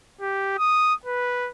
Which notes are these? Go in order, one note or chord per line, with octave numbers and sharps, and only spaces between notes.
G4
D#6
B4